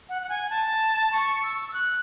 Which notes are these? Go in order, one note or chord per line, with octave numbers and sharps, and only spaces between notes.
F#5
F#5
G#5
A5
C#6
E6
E6
F#6